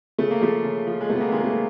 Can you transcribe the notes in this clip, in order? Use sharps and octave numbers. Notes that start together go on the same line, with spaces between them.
C#3 A3
A#3
F3 A3
C#3
F3
G#3
C3 A3
B3
G#3 A#3
D#3 F#3 G#3 A#3
A3
A#3